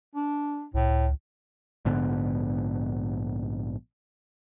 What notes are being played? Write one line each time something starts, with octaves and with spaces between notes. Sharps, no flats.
D4
C2 A2
C#2
A#1 G#2 D3 B3